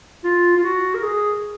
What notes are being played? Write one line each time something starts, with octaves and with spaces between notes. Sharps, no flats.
F4
F4
F#4
A#4
G#4